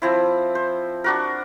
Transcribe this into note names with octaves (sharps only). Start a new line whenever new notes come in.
F3 C4 E4
C5
D4 F#4 A#4